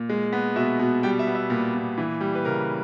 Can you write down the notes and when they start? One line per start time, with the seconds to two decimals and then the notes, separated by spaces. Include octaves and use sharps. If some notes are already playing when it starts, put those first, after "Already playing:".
Already playing: A#2
0.09 G#3
0.33 B3
0.56 B2 E5
0.79 B2
1.03 G3 G5
1.19 E5
1.27 B3
1.35 E5
1.50 A#2
1.75 A#2
1.98 E3
2.21 G3
2.35 B4
2.45 C#3 A#4